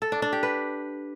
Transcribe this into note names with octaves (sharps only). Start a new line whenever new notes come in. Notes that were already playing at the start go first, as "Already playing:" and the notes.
A4
D4
D4
G4
B4